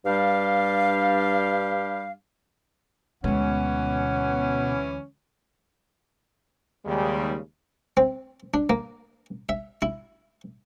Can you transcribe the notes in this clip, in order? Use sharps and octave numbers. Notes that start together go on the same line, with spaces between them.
G2 G3 D4 G4 F5
D2 B2 E3 G#3 C#4 F#5
D#2 C#3 G3 G#3
C4
D4
A#3
E5
E4